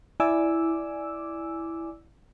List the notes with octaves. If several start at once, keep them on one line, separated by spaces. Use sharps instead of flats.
E4 D5 G#5 D6 E6